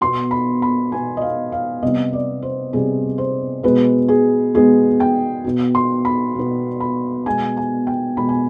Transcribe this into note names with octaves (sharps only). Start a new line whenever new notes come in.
B2 B3 C6
B5
B5
B2 B3 G#5
D#5
F5
F5
C3 G3 B3 D#5
D5
C5
C3 G3 B3 G#4
C5
B2 G#3 B3 B4
G#4
B2 G#3 B3 G#4
G5
B2 B3
C6
B5
B2 B3
B5
B2 G#3 B3 G#5
G#5
G5
B2 G#3 B3 B5
G#5